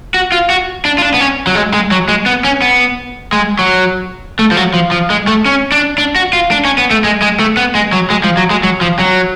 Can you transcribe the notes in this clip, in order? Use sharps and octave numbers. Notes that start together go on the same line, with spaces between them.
F#4
F4
F#4
D4
F4
D4
B3
C#4
F#3
G#3
G#3
F#3
G#3
B3
C#4
B3
G#3
F#3
A3
F3
F#3
F3
F3
G#3
A3
C#4
D4
D4
F#4
F4
D4
C#4
B3
A3
G#3
G#3
A3
B3
G#3
F#3
G#3
F3
F#3
G#3
F#3
F3
F#3